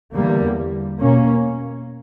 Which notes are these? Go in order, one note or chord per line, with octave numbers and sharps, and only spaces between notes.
E2 D3 G3 A#3
B2 A#3 C#4